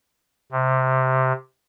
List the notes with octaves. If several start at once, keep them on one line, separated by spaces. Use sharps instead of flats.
C3